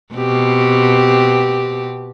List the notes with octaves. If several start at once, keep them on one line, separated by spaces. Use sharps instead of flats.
B2 C4 G4